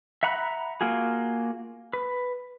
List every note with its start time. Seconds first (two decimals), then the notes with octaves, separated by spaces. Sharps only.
0.23 E5 F#5 A#5 B5 F#6
0.81 A#3 F4 F#4 G#4
1.93 B4